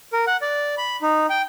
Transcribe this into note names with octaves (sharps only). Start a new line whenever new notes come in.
A#4
F#5
D5
B5
D#4
G5